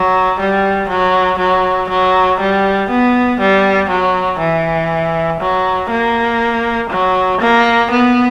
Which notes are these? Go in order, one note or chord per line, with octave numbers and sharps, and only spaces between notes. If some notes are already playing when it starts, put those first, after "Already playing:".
Already playing: F#3
G3
F#3
F#3
F#3
G3
B3
G3
F#3
E3
F#3
A#3
F#3
A#3
B3